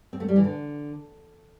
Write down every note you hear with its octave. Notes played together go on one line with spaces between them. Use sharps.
C4
A3
G3
E3
D3